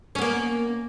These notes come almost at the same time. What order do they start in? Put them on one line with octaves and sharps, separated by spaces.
C#4 B3 A#3